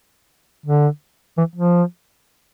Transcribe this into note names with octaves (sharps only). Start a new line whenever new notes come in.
D3
E3
F3